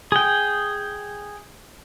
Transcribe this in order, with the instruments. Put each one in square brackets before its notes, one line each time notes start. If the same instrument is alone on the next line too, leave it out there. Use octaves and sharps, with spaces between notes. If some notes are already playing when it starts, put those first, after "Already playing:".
[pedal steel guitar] G#4 G5